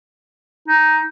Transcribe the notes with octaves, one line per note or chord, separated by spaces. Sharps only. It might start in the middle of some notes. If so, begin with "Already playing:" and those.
D#4